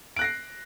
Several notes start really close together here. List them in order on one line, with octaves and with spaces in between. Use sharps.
D7 F#6 A#6 C7